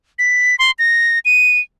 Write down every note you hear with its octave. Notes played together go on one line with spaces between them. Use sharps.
B6
C6
A#6
D#7